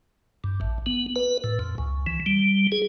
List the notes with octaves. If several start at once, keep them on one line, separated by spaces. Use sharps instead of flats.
G2
A1
B3
B4
A2
F2
C#2
E3
G3
G#4